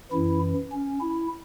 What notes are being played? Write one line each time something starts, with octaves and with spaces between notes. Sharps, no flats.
F#2 E3 E4
C#4
E4